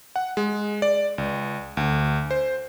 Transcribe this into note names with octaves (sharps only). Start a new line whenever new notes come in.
F#5
G#3
D5
C#2
D2
C5